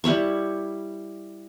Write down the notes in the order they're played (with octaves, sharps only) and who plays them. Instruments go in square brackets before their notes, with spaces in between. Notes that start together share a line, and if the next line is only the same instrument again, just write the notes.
[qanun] G3 E4 C#5 C#6